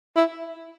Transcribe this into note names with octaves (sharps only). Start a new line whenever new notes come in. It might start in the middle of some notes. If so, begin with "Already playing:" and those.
E4